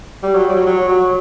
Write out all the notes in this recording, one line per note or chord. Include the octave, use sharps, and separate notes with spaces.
G3
F#3
G3
F#3
F#3
F#3